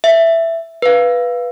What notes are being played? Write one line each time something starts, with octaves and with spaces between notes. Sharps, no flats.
E5
B4 F5